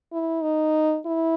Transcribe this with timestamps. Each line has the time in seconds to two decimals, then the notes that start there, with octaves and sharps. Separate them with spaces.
0.12 E4
0.43 D#4
1.06 E4